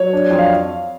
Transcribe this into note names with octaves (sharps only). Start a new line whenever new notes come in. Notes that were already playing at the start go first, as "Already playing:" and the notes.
Already playing: F#3 C#5
D4
F2
F5